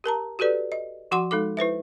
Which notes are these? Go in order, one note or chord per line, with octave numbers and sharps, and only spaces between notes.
G4 A#4 A5 A#5
F#4 G4 A4 B4 D5
D#5
F3 F#4 F#5 C6 D6
G#3 D#4 A4 D6
E4 B4 C5 E5